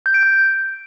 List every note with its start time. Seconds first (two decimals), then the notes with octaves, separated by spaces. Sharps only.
0.06 G6
0.14 D7
0.23 G6